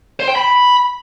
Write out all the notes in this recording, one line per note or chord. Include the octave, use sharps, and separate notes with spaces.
C5
G5
B5